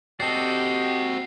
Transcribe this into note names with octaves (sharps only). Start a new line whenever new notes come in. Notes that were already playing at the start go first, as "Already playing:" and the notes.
C4 F#4 G4 A4 D5 D#5 G5 C7